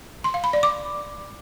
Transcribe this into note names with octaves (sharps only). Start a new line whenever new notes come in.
C6
F5
B5
D5
D6